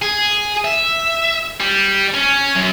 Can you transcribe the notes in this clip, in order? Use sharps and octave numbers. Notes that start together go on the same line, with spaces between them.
G#4
E5
G3
C#4
F#2